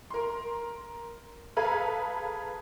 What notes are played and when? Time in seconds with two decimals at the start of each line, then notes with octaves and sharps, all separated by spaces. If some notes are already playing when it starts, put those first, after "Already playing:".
0.10 A#4 C6
1.56 G#4 A4 B4 F5 A#5